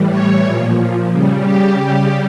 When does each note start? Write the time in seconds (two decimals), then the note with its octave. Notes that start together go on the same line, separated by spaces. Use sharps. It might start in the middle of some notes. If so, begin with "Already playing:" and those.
Already playing: A2 E3 G3
0.11 C#5
0.44 A#2 F3
1.12 C#3 G3
1.45 G4
1.79 C#3 G3 G4